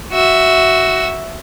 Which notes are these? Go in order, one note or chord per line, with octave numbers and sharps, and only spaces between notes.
F#4 E5